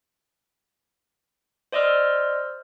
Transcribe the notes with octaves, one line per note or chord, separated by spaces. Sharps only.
C5 D5 D#5 C6 E6 F6